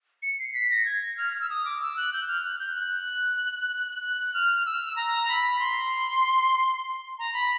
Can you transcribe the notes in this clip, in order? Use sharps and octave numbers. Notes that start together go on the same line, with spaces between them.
C#7
C7
B6
A#6
G#6
F6
F6
E6
D#6
D6
E6
F#6
G6
F6
F#6
G6
F#6
F#6
F6
E6
A#5
B5
C6
A#5
B5